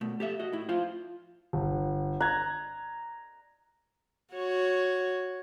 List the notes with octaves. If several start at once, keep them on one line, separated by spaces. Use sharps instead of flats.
B2 A3
G4 A4 E5
F#4 D#5
A2 E4
F4 C5 G5
G1
A#5 F#6 G#6
F#4 C#5